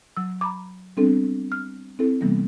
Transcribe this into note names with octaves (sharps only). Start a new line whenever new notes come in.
F#3 E6
A#5 B5 D6
G3 B3 C4 D4 A4
F6
C4 E4 A4
C3 E3 G3 A#3 B3